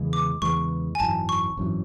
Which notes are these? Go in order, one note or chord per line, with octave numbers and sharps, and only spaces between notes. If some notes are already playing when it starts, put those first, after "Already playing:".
Already playing: E2 C#3 E3 G#3
D6
E2 C#3 E3 G#3 C#6
G#5
G#1 F#2 E3 A5
C#6
G#1 F#2 E3